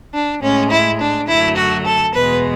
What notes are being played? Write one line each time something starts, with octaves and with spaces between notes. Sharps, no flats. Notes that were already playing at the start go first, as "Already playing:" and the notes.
D4
A2 G#3 C#4
E4
D4
F#2 D3 F#3 A3 E4
F#4
A4
E2 B2 G#3 B4